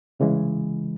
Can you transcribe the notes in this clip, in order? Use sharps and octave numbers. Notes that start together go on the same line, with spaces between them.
C2 C#3 E3 G#3